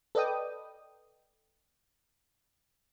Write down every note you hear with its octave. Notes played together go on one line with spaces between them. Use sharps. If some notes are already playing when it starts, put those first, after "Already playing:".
A4 B4 D5 D#5 G5 D#6